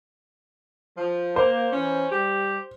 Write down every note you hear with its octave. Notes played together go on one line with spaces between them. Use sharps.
F3
A#3 C5
E3 C#4
G3 G4